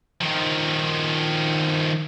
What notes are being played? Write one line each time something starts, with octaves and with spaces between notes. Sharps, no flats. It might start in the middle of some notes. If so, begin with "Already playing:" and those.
D#3 F3